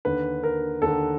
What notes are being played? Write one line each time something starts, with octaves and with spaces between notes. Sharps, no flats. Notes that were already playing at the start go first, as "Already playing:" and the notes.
D#2 D3 B4
A#4
D#2 D3 A4